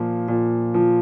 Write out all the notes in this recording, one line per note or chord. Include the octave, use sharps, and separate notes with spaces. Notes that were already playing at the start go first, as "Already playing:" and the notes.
Already playing: A#2 F3
A#2
F3